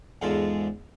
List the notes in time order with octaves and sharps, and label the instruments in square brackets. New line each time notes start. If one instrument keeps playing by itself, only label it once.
[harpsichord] E2 G#2 F3 G#3 F4 A4